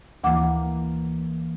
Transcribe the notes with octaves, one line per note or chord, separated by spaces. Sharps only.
D2 E3 A#3 F#5 D6